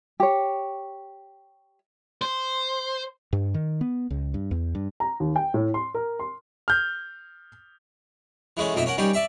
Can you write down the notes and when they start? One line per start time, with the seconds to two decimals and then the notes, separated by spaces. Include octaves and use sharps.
0.20 G4 C#5
2.22 C5
3.33 G2
3.54 D#3
3.81 B3
4.10 C#2
4.34 G2
4.51 E2
4.75 G2
5.00 A#5
5.20 D#2
5.36 G5
5.54 A2
5.74 C6
5.94 A#4
6.20 C6
6.68 F6 G6
8.57 E3 G#3 A3 C#4
8.74 B1 F2 A#3 D#5 E5
8.86 C#4 A#4 F#5
8.98 D#3 G3 C#4 G4
9.13 D5 E5 C#6